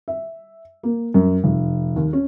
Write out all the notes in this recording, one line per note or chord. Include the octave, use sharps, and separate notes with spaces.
E5
A#3
F#2
F1
D#2
C#4